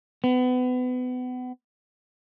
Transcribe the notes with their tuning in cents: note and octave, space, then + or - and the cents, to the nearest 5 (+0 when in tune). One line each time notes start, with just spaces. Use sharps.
B3 +30